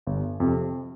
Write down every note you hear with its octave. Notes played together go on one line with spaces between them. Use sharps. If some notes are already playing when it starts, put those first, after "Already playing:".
G1
F2 C3